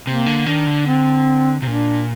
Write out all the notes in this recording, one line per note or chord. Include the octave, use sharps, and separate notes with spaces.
C3 A#3
D3
D#3 D4
D3
C4
C3
A#2 D4